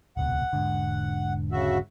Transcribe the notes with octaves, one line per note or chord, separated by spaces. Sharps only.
D#1 C#2 B2 F#5
E1 G#2 D3
C#3 F#4 E5